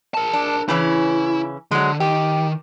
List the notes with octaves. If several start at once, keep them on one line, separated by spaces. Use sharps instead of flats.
A#4 A5
D4
C#3 E3 C#4 E4
D3 F#3 G#3
D#3 G4